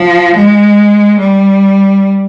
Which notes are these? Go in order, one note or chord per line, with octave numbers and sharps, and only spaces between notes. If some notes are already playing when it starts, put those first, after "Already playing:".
Already playing: F3
G#3
G3